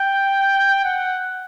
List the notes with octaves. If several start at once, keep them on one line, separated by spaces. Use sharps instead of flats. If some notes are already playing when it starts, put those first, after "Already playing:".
Already playing: G5
F#5